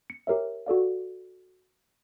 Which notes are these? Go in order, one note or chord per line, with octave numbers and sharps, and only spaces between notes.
C#7
G4 A#4 C#5 E5
F#4 A4 D5 F5